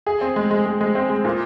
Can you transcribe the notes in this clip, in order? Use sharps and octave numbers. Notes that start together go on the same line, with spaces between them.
G#4
C4
G#3
G#3
G#3
G#3
C4
G#3
A#2